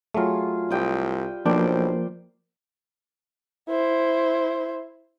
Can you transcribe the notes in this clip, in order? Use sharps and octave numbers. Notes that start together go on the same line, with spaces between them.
F#3 A3 F4 G#4
C2 G3 G5 D#6
B1 F3 A#3 D4 A#4 C5 D5 G5
E4 C5